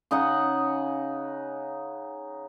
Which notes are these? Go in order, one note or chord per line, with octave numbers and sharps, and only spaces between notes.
C#3 D#4 D#5 F#5